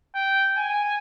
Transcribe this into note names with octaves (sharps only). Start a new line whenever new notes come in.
G5
G#5